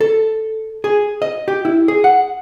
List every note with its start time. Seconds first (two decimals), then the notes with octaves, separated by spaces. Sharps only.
0.01 A4
0.84 G#4
1.22 D#5
1.48 G4
1.65 E4
1.88 G#4
2.04 F#5